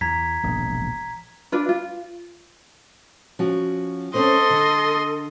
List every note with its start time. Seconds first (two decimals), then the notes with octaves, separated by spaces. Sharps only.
0.01 E2 A#5 G#6 B6
0.43 E1 A#1 G#2
1.52 D4 F4 B4
1.69 F4
3.39 F3 C#4 F#4
4.14 C4 C#4 A4 C5 D#5 C6
4.50 D3